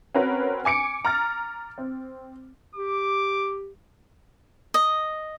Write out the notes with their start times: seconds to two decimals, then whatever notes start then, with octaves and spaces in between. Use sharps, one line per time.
0.15 C4 C#4 F#4 A#4 B4 C#5
0.65 G#5 D6 C#7 D7
1.05 A#5 F6 A6
1.78 C4
2.76 G4 D6
4.74 D#5